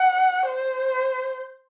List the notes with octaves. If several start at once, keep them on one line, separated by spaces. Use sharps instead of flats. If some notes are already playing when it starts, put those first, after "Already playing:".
Already playing: F#5
C5